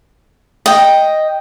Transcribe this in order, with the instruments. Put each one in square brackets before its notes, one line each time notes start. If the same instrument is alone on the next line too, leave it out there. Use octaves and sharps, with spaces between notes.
[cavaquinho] D#5 G5